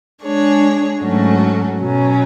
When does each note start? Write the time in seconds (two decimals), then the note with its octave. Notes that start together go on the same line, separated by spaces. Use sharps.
0.24 G#3 D4 G#4 C#5
1.01 G#2 F#3 A3 C#4 F#4
1.79 B2 F#3 C#4